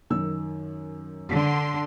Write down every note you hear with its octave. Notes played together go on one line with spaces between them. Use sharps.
F#2 D#3 E6
D3 C6